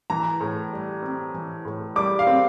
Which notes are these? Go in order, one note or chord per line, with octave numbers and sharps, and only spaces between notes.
E3 A#5
A2
G3
C4
E3
A2
G3 D6
F5
C4